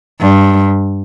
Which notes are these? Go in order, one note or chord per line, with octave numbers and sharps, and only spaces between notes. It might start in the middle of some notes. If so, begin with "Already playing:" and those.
G2